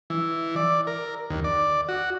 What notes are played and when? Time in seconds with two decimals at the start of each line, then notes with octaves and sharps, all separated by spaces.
0.10 E3
0.56 D5
0.87 A#4
1.30 D#2
1.44 D5
1.89 F#4